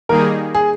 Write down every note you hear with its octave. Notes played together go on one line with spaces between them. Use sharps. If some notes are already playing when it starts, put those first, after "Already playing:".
D#3 G3 A#3 D#4 G#4 A#4
G#4